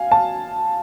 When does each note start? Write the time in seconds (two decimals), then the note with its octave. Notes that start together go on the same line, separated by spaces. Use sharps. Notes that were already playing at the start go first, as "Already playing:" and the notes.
Already playing: F5 G#5
0.12 A5